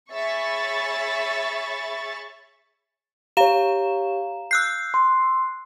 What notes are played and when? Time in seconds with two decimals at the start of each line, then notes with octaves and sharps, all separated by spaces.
0.12 G#4 C#5 E5 B5 C#6 A6
3.37 G4 C#5 F5 A#5 E7
4.51 E6 F#6 G6 C7
4.94 C6